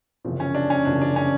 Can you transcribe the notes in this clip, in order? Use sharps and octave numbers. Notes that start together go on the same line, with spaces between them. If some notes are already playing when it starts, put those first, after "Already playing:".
F#1 E2 C3 F3
C#4
D4
C#4
F#1 E2 C3 F3 D4
D4
C#4